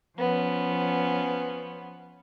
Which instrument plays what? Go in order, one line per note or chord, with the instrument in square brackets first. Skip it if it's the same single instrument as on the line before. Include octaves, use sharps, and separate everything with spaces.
[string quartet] F3 B3 C#4